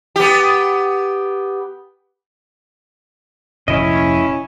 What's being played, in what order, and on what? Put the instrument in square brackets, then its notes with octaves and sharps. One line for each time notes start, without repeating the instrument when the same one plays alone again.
[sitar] B3 G4
[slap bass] F1 A#2 [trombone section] C#4 [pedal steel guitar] E4 D#5